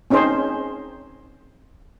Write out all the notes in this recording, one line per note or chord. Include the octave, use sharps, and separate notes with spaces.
C4 C#4 D#4 G#4 C5